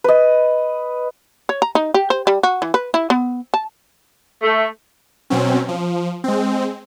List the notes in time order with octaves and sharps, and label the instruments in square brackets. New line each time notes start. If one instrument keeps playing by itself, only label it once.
[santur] B4 D#5
[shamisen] C#5
A#5
D#4
G4
C5
G3
F#4
E3
B4
E4
B3
A5
[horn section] A3
[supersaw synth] B2 F#3 C4 C#4
F3
G#3 C4